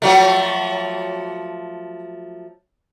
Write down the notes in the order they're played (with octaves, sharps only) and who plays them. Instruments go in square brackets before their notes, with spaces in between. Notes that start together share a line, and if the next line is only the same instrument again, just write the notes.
[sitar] F3 F#3 A3